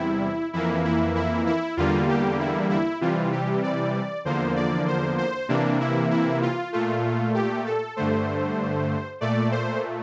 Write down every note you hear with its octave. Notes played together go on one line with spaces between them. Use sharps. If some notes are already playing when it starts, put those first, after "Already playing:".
Already playing: E2 C3 G3 E4
F2 E3 A#3 E4
E4
E4
E4
E2 D3 G3 A#3 F4
G4
E4
E4
C3 E3 G3 F4
G4
D5
E2 D3 F3 A#3 C5
D5
C5
C5
C3 E3 A#3 D4
E4
E4
F4
A#2 A3 F4
G4
A4
G2 D3 A3 C5
A#2 A3 D5
C5